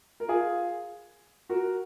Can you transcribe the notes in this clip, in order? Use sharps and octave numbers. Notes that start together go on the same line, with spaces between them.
A#4
F4 G#4
F#4 A#4